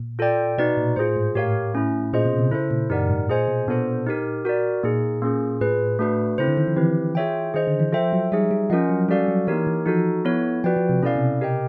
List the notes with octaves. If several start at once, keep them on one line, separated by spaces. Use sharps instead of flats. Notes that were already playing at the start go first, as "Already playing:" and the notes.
Already playing: A#2
F4 A4 D5 G5
B2 D#4 F#4 B4 D5
A#2
A2 F4 G#4 C5
G#2
A2 G4 A#4 C#5 F5
A3 C#4 E4
A#2 C#4 F4 G#4 C5 D#5
B2
C3
C#3 E4 A4 C5
A#2
F#2 D#4 G4 A#4 D5 F#5
G#2
A#2 F4 G#4 C5 D#5 G#5
B2
A#2 B3 D4 F4 A4 C5
D#4 G4 A#4
F#4 A#4 D5
A#2 A#3 D#4 G#4
A#3 C#4 F4 G#4
A2 F4 G#4 B4
A3 D4 F#4 B4
C#3 C4 E4 A4 C5
D3
D#3
F3
E3 C4 E4 G4 B4
F4 G#4 C#5 E5 G5
D#3 G#4 C5 D#5
D3
E3
F3 F4 A4 C5 E5 G5
F#3
G3 D#4 G#4 C#5 E5
G3
F3 C#4 F4 A#4 D#5 F#5
F#3
G3 C#4 F#4 A4 D5 F5
F#3
E3 A#3 D#4 G4 A#4 C#5
E3
F3 D#4 F#4 A4
B3 E4 A4 C#5
F3 F#4 B4 D5 G5
F3
C3
B2 C#4 E4 A4 D5 F5
C3
G4 A#4 D#5 G5